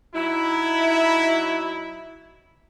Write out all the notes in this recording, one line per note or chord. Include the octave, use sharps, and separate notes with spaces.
F#3 D#4 E4